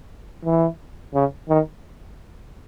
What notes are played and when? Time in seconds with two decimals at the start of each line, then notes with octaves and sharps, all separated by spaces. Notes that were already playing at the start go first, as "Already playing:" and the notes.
0.45 E3
1.14 C#3
1.49 D#3